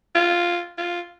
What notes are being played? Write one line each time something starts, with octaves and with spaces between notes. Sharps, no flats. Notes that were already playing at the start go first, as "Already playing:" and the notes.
F4
F4